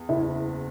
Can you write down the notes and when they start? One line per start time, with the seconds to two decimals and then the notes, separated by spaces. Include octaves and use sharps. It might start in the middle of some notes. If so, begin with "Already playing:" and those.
Already playing: E2
0.09 F#1 E4